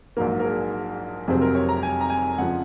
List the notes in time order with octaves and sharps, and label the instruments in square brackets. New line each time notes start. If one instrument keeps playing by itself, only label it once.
[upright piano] A#1 G#2 F#3 A#3 A#4
A#4
G#4
F1 F2 C3 F#3 C4 G#4
A#4
C#5
A#5
G#5
A#5
G#5
F2 C#3 F3 F#5